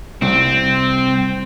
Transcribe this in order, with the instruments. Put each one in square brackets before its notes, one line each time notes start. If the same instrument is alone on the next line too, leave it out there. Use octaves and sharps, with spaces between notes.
[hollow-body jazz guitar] C2 [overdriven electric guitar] C4